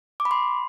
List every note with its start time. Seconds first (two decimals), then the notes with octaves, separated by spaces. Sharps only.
0.20 D6
0.25 B5
0.31 C6